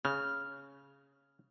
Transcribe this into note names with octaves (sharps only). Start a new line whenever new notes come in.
C#3 F6